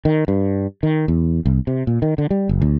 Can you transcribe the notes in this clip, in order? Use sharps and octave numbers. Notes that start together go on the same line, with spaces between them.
D#3
G2
D#3
E2
C2
C3
A#2
D#3
D3
G3
F#1
D2